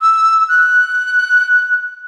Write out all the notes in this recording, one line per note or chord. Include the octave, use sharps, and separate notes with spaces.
E6
F#6